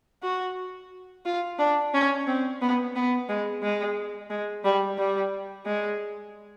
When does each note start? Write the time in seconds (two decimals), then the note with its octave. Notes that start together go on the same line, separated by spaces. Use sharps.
0.23 F#4
1.26 F4
1.59 D4
1.94 C#4
2.27 C4
2.61 B3
2.95 B3
3.29 G#3
3.63 G#3
4.30 G#3
4.64 G3
4.98 G3
5.65 G#3